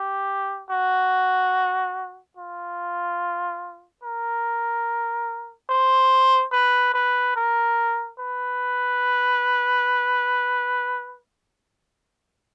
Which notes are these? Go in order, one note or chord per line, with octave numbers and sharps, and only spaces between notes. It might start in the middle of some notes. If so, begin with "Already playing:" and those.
Already playing: G4
F#4
F4
A#4
C5
B4
B4
A#4
B4